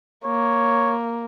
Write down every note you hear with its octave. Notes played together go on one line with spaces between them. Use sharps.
A#3 C#5